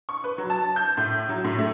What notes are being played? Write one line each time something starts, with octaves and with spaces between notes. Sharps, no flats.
C#6
B4
F#3
A5
G6
A2
F#3
A2
A3